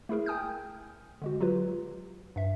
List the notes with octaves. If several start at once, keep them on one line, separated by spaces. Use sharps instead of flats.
A3 E4 G#4 A#4
G5 G#5 D#6 F6 G6
D3 G#3 F#4
F#3 F4 G4 B4
G2 E5